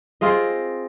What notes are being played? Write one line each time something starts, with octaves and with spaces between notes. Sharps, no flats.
C4 F4 G#4 D#5